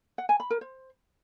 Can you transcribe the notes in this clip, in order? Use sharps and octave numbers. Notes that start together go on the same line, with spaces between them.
F#5
G#5
B5
A#4
C5